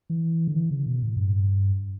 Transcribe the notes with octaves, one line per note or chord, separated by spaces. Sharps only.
E3
D3
E3
C#3
B2
A2
G2